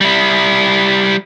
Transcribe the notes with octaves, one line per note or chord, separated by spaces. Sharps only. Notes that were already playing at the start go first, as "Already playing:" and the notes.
G3 E4